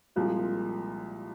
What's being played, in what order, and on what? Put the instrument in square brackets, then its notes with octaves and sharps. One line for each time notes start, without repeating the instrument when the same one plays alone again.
[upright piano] C2 A#2 F3 G#3